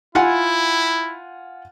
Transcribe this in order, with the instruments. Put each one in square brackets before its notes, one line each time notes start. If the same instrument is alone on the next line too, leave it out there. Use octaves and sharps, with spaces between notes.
[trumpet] E4 [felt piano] F4 F#5 G#5